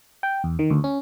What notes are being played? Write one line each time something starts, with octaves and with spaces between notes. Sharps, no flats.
G5
E2
D#3
D2
C#4